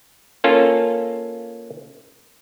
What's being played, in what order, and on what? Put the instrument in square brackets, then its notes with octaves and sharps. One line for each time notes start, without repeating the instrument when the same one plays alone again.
[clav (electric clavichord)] A#3 C#4 F4 A4